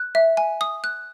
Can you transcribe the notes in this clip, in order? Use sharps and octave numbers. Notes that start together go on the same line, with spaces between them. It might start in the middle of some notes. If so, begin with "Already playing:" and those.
Already playing: F#6
E5
G#5
D#6
F#6